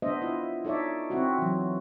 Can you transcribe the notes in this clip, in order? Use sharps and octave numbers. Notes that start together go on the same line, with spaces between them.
B3 D4 C5 D#5 E5
E4 F4
D#4 A4 C#5 D5 E5
C4 E4 F#4
E3 F#3